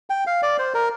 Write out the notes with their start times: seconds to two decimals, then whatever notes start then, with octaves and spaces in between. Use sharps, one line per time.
0.10 G5
0.27 F5
0.42 D5
0.59 C5
0.74 A#4